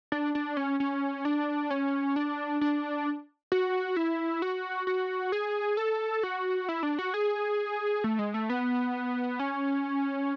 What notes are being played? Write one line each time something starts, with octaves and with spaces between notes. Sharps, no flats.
D4
D4
C#4
C#4
D4
C#4
D4
D4
F#4
E4
F#4
F#4
G#4
A4
F#4
E4
D4
F#4
G#4
A3
G#3
A3
B3
C#4